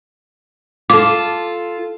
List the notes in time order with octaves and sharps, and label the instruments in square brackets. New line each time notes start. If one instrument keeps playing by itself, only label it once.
[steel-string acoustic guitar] F4 A4 [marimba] D6